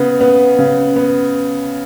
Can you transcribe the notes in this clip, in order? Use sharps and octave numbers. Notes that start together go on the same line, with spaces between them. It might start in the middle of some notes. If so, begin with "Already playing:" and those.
Already playing: C#3 B3
B3
C#3
B3